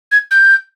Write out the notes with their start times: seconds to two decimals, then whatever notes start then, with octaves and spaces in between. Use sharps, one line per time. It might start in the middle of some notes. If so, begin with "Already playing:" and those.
0.12 G#6
0.31 G6